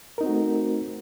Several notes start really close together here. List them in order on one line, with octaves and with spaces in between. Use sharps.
A#4 D#4 C4 F#4 A3